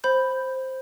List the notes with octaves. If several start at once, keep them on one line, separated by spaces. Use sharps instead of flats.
C5 B5 G6